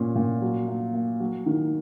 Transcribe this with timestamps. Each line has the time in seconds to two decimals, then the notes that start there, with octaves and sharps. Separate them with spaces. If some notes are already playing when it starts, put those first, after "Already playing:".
Already playing: A#2 C#4
0.16 A#2
0.42 F#3
0.68 A#3
0.94 A#3
1.20 F#3
1.46 D#3